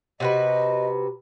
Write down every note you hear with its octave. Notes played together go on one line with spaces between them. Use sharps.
C3 F#4 B4 D#5